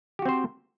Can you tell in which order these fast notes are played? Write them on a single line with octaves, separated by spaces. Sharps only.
G4 F#4 C4 C5